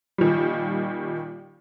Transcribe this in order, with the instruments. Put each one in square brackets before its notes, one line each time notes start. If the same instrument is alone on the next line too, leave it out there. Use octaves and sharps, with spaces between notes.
[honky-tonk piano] A#2 D#3 F3 G3